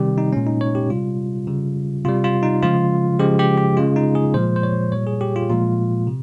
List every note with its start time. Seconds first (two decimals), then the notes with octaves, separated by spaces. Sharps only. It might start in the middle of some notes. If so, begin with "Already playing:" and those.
Already playing: C3 D#3 G3 G4
0.18 D#4
0.32 A#2 G#3 C#4
0.47 D#4
0.61 C#5
0.75 G4
0.89 C3 G3 F4
1.47 C#3 G3
2.05 C3 G3 F4
2.24 F4
2.43 D#4
2.63 C#3 F3 G#3 F4
3.19 C#3 F3 G#3 G4
3.39 G4
3.58 G4
3.77 C#3 G#3 F4
3.96 D#4
4.15 G#4
4.34 A#2 F3 G#3 C5
4.56 C5
4.63 C#5
4.92 A#2 G3 C#5
5.07 G#4
5.21 G4
5.36 F4
5.50 A#2 F3 G#3 F4
6.07 C3